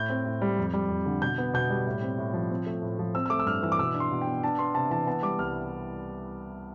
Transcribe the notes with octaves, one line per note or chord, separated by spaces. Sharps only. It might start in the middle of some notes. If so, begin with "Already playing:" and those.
Already playing: A2 G6
C4
A2
G3
F2
G3
F2
D3
B2 G6
B3
B2 G6
G3
A2
C4
A2
F3
C4
A3
A2
F3
C4 E6
E6
A3 D6
E6
G2 F6
E3 E6
D6
B2 E6
D4
C6
B2
G5
B3
D4 A5
B3 C6
C3 A5
E3 A5
B3 A5
G3 D6
C2 F6